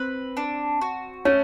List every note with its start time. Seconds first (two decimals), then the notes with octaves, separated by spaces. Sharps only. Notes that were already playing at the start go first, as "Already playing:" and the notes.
Already playing: C4 B4
0.37 D4
0.81 F#4
1.25 A3 C#4